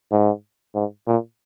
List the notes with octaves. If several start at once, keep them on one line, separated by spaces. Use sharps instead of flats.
G#2
G#2
A#2